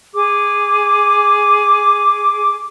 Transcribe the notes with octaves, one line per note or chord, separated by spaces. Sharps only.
G#4 D6